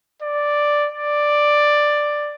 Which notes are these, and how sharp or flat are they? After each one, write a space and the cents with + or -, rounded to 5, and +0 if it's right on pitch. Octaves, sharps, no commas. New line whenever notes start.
D5 +0
D5 +5